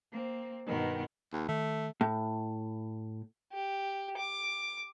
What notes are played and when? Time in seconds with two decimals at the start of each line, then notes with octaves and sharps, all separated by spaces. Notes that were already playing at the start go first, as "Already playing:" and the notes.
0.11 A#3 C4
0.66 G2 B2 D#3 B3 A#4
1.33 D#2
1.49 D#3 A3
2.01 A2
3.52 G4
4.17 D6